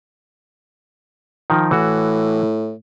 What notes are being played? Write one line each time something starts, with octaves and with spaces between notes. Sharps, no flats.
D#3 F3 D#4
A2 E3 F#4